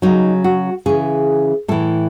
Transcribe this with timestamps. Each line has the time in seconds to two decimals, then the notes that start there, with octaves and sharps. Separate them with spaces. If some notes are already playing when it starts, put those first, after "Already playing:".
0.02 C#3 F#3 D#4
0.44 F#4
0.86 C#3 E3 G#4
1.68 A2 E3 A4